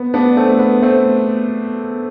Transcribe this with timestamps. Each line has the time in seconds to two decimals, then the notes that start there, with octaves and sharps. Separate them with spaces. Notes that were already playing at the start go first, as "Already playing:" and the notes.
Already playing: B3
0.14 B3 D4
0.36 A3 C4
0.59 B3
0.82 A3 C4